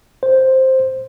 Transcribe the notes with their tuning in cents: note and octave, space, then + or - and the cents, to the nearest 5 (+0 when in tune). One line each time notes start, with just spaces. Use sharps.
C5 +5